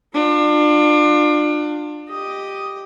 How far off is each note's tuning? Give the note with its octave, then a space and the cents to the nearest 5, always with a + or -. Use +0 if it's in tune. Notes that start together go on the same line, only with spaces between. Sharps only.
D4 +30 F4 +25
G4 +0 D#5 +0